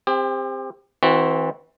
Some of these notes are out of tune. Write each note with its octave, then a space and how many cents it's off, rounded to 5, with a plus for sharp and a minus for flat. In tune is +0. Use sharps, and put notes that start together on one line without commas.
C4 +0 G4 +35
E3 -35 C4 +0 F#4 +0